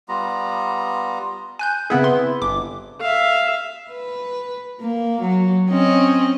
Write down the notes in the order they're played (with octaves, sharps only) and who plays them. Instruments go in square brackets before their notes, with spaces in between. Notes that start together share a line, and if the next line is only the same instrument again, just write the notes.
[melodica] G3 B3 F4 A#5
[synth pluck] G#5 F#6 G6
[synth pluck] C#3 C4 G#4 [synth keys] B3 E4
[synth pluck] C6
[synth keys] G1 [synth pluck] D6
[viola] E5 F5
[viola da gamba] B4
A#3
F#3
C4 C#4 D#5